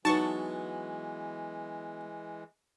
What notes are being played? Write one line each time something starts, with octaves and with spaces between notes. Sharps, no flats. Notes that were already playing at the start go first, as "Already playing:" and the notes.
E3 F#3 G#3 B3 D#4 A5 C#6